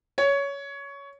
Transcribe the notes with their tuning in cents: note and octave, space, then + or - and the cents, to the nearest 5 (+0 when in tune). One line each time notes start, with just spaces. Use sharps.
C#5 +15